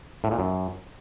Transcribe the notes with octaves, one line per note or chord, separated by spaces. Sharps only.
A2
A#2
F#2